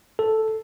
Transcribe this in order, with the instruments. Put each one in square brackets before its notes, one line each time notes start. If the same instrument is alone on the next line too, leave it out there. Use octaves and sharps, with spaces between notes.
[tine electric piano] A4